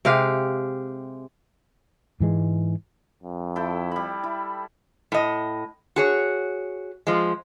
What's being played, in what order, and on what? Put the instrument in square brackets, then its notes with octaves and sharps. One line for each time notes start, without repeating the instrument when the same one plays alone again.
[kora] C3 G#3 G4 F5
[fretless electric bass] G#2 E3 G#3
[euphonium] F2
[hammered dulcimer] E4 A4 G5
G3 B5
E4
[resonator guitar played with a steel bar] A2 D#5
F#4 G#4 C#5
F3 G#3